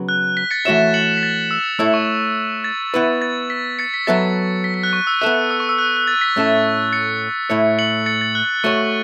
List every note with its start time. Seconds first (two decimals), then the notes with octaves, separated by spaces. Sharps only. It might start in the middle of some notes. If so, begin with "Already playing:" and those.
Already playing: C#3 F#3 B3
0.09 F#6
0.37 B6
0.51 A6 C#7
0.65 E3 A3 F#4 C#5 E5 B6 E7
0.94 C#7 F#7
1.17 B6
1.23 A6
1.51 E6
1.79 A3 E4 A4 C#5 E5 E6
1.94 C#6
2.64 A6
2.94 B3 E4 B4
3.22 A6
3.50 B6
3.79 A6 C#7
3.94 B6
4.07 F#3 B3 A4 E5 A6
4.64 B6
4.74 B6
4.83 F#6
4.93 C#6
5.07 E6
5.21 B3 A4 E5 F#6
5.51 E6
5.60 C#6
5.69 E6
5.79 F#6
5.97 F#6
6.07 A6
6.21 B6
6.36 A2 A3 C#4 A4 E5
6.92 A6 C#7
7.50 A2 A3 E4 C#5
7.79 C#7 F#7
8.06 A6 C#7
8.21 A6
8.35 F#6
8.64 A3 F#4 C#5 C#6